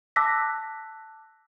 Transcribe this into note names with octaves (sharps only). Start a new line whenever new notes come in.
A5 D6 E6 F#6 A#6 B6